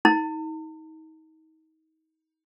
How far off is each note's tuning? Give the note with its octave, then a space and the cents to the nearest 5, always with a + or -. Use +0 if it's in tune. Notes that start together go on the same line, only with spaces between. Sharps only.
D#4 +30 A5 +45